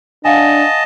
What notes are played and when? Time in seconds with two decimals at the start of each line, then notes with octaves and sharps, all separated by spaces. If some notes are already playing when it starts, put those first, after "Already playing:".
0.25 D4 D#5 F5 F#5 G#5 A5